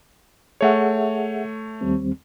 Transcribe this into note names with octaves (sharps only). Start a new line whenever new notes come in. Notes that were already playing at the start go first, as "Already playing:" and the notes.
A3 G#4 C#5 E5 F#5
D#2 G3 C4